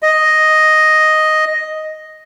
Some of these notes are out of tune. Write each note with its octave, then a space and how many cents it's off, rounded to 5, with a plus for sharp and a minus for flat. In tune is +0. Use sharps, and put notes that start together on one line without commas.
D#5 +0